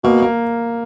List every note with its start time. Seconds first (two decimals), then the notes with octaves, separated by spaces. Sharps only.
0.04 B2 A#3
0.22 A#3